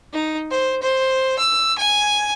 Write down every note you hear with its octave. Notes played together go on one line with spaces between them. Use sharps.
D#4
C5
C5
E6
G#5